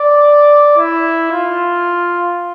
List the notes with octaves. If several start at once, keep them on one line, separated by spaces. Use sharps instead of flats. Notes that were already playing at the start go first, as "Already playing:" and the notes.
Already playing: D5
E4
F4